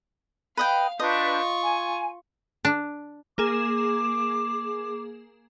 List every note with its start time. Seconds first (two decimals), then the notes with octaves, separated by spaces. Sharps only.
0.57 B4 D#5 F5 G5
0.99 D4 F4 B4 D#5 C#6 G6
1.63 G#5
2.65 D4
3.38 A#3 G#4 D6 E7